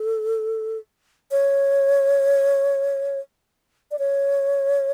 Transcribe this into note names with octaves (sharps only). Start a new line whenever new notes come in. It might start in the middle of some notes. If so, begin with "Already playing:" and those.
Already playing: A4
C#5
D5
C#5